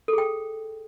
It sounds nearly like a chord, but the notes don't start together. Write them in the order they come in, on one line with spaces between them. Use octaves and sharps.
A4 G#4 G5